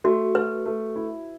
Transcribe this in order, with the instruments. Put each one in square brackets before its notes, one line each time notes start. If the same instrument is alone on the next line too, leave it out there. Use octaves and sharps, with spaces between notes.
[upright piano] A3 [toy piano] F#4
[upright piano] A3 [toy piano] B4
[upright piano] A3
E4